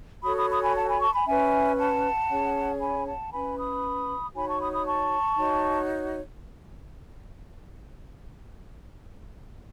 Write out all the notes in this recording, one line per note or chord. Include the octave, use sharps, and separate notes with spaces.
F#4 A4 C#5 B5 D#6
B5 D#6
B5 D#6
G#5 B5
F#5 A5
G#5 B5
A5 C#6
G#5 B5
C#4 E4 B4 E5 G#5
F#5 A5
C#4 G#4 C#5
G#5 B5
F#5 A5
C#4 E4 B4 G#5 B5
B5 D#6
D#4 F#4 C#5 G#5 B5
A5 C#6
B5 D#6
B5 D#6
A5 C#6
D#4 F#4 C#5